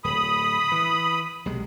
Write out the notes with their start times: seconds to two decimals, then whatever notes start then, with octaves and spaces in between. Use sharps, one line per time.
0.04 D1 B5 D#6
0.72 E3
1.45 B1 C3 G#3